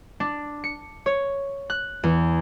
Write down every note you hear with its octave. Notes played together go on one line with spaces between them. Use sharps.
D4
C#7
C#5
F#6
E2